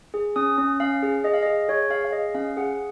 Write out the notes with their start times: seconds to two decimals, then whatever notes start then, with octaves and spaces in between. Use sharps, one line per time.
0.14 G#4
0.36 C#4 D#6
0.58 C#4
0.80 C#4 F5
1.03 G#4
1.24 G#4 D#5
1.34 F5
1.43 D#5
1.46 G#4
1.69 G#4 C#5
1.90 G#4 F5
2.05 F5
2.12 G#4 D#5
2.35 C#4 F5
2.57 G#4 F#5